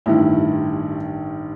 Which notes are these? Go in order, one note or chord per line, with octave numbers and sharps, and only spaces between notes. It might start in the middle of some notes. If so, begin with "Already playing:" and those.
A1 G2 D#3 E4